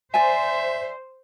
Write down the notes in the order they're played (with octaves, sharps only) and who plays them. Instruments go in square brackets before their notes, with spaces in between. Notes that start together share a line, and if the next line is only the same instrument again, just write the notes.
[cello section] C5 [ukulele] D5 G#5 [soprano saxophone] E5